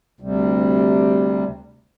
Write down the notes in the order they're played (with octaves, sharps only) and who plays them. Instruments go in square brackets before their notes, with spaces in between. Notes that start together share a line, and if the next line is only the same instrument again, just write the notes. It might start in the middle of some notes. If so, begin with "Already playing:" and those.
[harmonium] D2 C3 G3